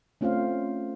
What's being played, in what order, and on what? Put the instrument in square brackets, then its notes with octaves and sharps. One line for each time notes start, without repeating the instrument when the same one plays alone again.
[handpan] A3 C4 C#4 F4 C5 F5